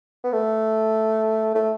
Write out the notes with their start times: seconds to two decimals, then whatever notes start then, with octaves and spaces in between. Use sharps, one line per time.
0.24 B3
0.32 A3
1.55 A3